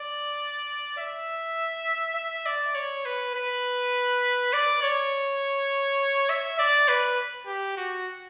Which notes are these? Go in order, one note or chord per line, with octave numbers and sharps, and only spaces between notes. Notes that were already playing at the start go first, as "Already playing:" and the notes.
Already playing: D5
E5
E5
D5
C#5
B4
B4
D5
C#5
E5
D5
B4
G4
F#4